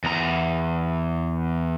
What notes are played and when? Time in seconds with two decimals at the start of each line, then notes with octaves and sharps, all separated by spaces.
0.04 E2 A#5